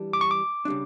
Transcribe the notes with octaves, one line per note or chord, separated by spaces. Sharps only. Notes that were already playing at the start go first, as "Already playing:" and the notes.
Already playing: E3 G3 D4
D6
C#6
D6
C#3 G3 D4